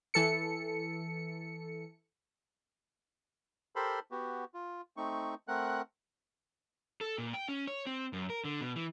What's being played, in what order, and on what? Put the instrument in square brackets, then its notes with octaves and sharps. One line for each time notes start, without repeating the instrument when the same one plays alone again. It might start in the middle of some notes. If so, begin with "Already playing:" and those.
[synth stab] E3 A4 C#7
[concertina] G4 A4 A#4 C5 B5 C6
B3 F#4 G4
F4
A3 C4 D#4 C#6
A3 C4 A#4 F#5 F#6
[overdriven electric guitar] A4
A#2
G5
C#4
C#5
C4
F#2
A#4
D3
B2
E3